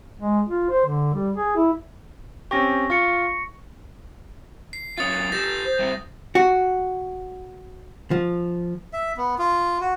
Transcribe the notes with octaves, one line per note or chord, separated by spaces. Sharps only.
G#3
F4
C5
D3
G3
G#4
E4
C4 C#4 G4 C#6 A#6
F4 C#6 C#7
C7
F#3 C#4 F4 D#6 A6
G4 A4 G6 A#6
C5
G3 A3 C4
F#4
F3
E5
B3
F4
F#4